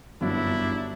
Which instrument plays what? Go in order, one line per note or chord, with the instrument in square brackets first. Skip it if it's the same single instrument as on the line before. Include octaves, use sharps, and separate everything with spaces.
[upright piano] G1 F#2 [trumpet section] D4 E4